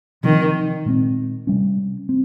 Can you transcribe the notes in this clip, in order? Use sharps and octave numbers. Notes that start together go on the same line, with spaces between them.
C3 D#3 F3 C4
A#2 G#3 C4
C3 G3 C#4
C4